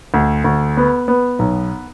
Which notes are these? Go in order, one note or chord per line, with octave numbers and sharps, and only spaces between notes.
D2
D2
B3
B3
B1